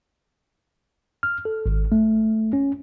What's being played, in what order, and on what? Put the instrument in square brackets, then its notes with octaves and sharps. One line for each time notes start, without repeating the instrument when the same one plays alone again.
[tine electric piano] F6
A4
G#1
A3
C#4